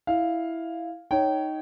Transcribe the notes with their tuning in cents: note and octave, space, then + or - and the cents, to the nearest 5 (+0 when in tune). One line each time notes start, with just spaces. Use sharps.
E4 +0 F5 +0
D#4 +0 C#5 +0 G5 -20